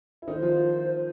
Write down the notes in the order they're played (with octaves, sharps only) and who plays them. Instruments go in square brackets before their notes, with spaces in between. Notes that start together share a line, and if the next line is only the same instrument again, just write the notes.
[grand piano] E4
[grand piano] D#3 D#4 [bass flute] C5
[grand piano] F3 F4